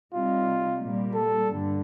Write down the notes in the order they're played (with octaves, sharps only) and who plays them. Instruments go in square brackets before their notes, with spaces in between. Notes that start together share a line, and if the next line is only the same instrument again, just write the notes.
[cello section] C3 G3 C4 D#4 [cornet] F4
[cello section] A#2 G3 A#3
[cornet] A4
[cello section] G2 D3 G3